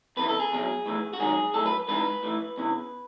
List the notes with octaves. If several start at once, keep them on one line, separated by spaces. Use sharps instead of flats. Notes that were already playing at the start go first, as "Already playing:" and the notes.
E2 C#3 E3 B4
A4
G#4
E2 B2 F#3
A2 E3
F#4
G#2 D#3 F#3 G#4
A2 F#3 A4
B4
G#2 E3 B4
A2 E3
E2 C#3 E3